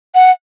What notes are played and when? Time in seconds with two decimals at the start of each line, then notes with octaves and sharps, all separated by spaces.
0.15 F#5